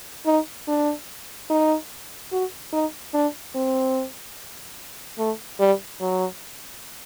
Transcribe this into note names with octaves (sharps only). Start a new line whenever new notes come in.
D#4
D4
D#4
F#4
D#4
D4
C4
A3
G3
F#3